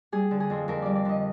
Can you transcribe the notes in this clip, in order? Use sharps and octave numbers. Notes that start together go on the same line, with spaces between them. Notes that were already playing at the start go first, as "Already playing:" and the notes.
G3 G#4
D3
G#4
F2
F2 A#4
G3 D5
D5
D3 D#5